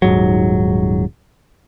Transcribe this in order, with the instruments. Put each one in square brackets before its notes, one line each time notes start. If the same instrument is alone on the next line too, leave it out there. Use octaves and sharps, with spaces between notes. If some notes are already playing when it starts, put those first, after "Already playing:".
[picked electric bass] D#1 G#2 F#3